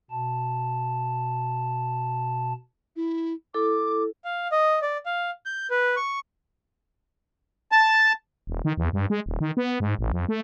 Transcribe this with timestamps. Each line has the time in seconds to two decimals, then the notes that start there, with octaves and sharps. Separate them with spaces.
0.10 B2 A5
2.96 E4
3.54 E4 A4 D6
4.25 F5
4.52 D#5
4.82 D5
5.06 F5
5.46 G6
5.70 B4
5.97 C#6
7.72 A5
8.47 E1
8.65 D#3
8.77 E2
8.93 G2
9.10 G#3
9.26 D#1
9.40 D#3
9.57 B3
9.80 G#2
9.99 A1
10.12 F2
10.29 A3